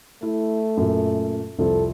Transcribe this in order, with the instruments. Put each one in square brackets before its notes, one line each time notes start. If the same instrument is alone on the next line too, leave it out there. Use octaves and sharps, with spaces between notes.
[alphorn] A3 [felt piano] E4
[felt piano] F#2 A#2
[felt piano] C2 F2 [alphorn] A4